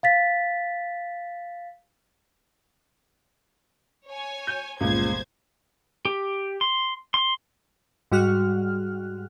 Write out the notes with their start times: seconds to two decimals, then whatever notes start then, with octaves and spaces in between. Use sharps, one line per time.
0.03 F5 A6 B6
4.09 C#5 G#5
4.47 G6
4.81 G1 C#2 A#2 G#3 C5 G#6
6.05 G4
6.61 C6
7.14 C6
8.11 G#2 G3 F#4 F6 F#6